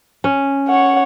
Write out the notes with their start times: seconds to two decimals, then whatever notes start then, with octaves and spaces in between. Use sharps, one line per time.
0.24 C#4
0.68 C#5 F#5